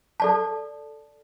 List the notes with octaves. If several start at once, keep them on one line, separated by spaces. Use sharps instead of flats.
A4 D5 A5